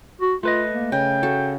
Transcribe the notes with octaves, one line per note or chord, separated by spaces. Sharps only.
F#4
A3 F4 B4 D#5
A#3
C#3 G5
F#4 A4